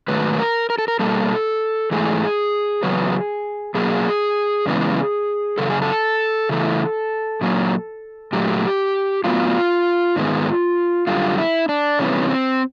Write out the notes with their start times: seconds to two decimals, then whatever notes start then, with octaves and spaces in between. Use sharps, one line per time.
0.08 G#2 D#3 F#3 A3 B4
0.39 A#4
0.70 A#4
0.78 A4
0.88 A#4
0.99 B2 G3 A#3 A4
1.91 G#2 E3 A3 G#4
2.83 E2 C#3 F#3 B3
3.75 B2 F#3 A#3 G#4
4.66 F#2 C#3 E3 G#3 B3
5.58 F#2 C#3 A4
5.70 G#4
5.82 A4
6.49 C#3 E3 A3
7.41 A#2 F#3 A#3
8.33 A#2 F#3 A3 G4
9.24 A2 F#3 B3 F4
10.16 G#2 D#3 G#3 B3
11.07 F#2 D3 G3 F4
11.38 E4
11.69 D4
11.99 C3 E3 G3 B3 C#4
12.30 C4